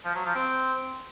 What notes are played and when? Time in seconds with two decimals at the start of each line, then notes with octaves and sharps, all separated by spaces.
0.05 F3
0.15 F#3
0.25 F3
0.35 C4